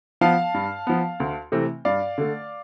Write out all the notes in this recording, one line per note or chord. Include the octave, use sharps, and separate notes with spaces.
F3 B3 F5 A5
G2
F3 B3
D2
C3 E3 A3 C4
G2 D5 F5
D3 A3